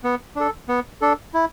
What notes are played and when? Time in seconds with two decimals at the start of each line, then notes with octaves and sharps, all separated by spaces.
0.04 B3
0.36 D4 A4
0.68 B3
1.01 D4 A4
1.34 E4